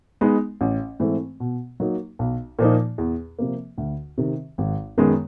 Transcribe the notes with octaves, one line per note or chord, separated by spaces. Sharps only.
G#3 B3 D#4
A1
G#2 E3 A3 C4
B2
F#3 A#3 D#4
B1
A#2 F3 A#3 D#4
E2
C3 F3 A#3
D2
C3 D#3
G#1
F#2 D#3 G#3 B3